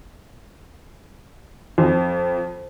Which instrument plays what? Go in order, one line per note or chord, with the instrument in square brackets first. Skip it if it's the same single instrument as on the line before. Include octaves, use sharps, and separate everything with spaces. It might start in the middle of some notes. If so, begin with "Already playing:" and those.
[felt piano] F2